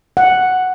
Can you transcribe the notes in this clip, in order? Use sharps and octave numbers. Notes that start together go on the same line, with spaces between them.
F#5